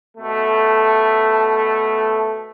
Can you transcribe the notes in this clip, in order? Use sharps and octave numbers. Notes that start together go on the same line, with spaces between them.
B2 A3